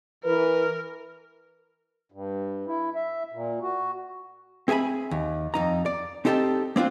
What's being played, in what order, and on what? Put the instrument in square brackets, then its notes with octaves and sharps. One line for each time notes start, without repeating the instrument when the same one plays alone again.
[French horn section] E3 B4 [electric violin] A#4
[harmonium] G2
E4
E5
A#2
F#4
[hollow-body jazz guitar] C4 G#4 E5 G#5 B5
D#2
F2 D#4 A#5
D5
C4 D#4 G4 A4 G5 A5
A#3 C4 D4 F4